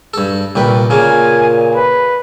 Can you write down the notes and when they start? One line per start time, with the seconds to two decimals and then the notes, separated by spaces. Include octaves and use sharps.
0.14 G2 A4
0.56 C2 A#2 B4 G5
0.90 A#2 C#3 A#3 G#5
1.75 B4